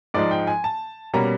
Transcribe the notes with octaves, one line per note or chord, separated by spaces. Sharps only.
G#2 F3 G#3 D5
G5
G#5
A5
B2 G3 A#3 C#4 A#5